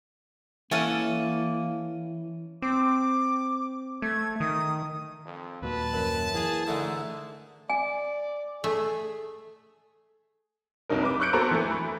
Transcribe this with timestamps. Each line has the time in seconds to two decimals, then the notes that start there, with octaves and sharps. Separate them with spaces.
0.71 E3 A#3 C#4 A4 E5 F#5 F6 D#7
2.62 C4 D6
4.02 A3 G#6
4.40 D#3 D#6
5.25 F2
5.62 D#2 A#2 F#3 B4 A5
5.94 F#2
6.34 E3 A#3 G#4
6.66 G#2 D3 A3 D#6
7.70 D5 G#5
8.64 A3 G#4
10.89 C2 F#3 D#4 A#4
11.03 B4 D6
11.20 C#6 E6 F#6 G6 C#7 D7
11.33 B3 F#4 A4 A#4 C5 A#5
11.51 E3 A3
11.71 B5